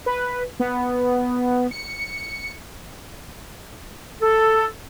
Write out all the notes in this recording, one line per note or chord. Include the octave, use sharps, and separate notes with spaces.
B4
B3
C#7
A4